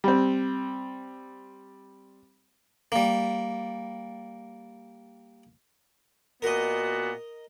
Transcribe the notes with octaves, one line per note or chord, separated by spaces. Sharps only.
G3 C4
G3 A#3
A#2 B3 F#4 A#4 D#5